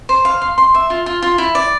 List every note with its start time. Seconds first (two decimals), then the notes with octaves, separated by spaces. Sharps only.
0.09 C5
0.25 F5
0.42 C6
0.58 C6
0.74 E5
0.90 F4
1.06 F4
1.22 F4
1.38 E4
1.55 D5